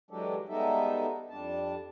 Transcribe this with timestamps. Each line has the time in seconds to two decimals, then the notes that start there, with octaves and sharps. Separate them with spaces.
0.11 E3 F#3 G#3 D4 G4 A4
0.49 G3 G#3 B3 D#4 A4 E5
1.30 F2 G3 D4 A5